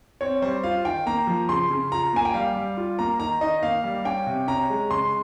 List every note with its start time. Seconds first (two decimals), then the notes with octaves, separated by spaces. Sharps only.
0.21 C4 C#5
0.42 G3 C5
0.64 F4 F5
0.85 D#3 G5
1.06 A#3 A#5
1.27 F3
1.49 C#3 C6
1.70 C#3
1.92 F4 A#5
2.13 A#3 G#5
2.25 G5
2.34 G3 F5
2.56 G3
2.77 F4
2.99 A#3 A#5
3.20 D#3 A#5
3.41 D#3 D#5
3.63 A#3 F5
3.84 G3
4.05 C#4 G5
4.27 C3
4.48 C#4 A#5
4.70 G#3
4.91 C#3 C6